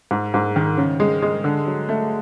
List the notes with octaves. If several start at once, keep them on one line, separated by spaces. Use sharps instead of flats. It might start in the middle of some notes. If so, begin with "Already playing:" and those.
G#2
G#2
D#3
C#3
G#3
G#3
D3
F#3
A3